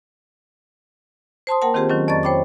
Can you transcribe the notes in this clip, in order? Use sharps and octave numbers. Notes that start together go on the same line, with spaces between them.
C5 A5 C6 D#6
A#3 A#4 F#5 G5 A5
D#3 C4 F4 G4 G#4 C5
D#3 F#3 C#4 F4
F2 D5 D#5 A#5 C#6 A6
C5 C#5 G5 B5 D6